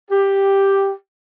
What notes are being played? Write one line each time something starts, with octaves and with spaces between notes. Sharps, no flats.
G4